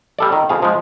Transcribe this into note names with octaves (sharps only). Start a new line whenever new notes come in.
G3 A4 D5
D#3
F2 G#4 F5
F3 G#3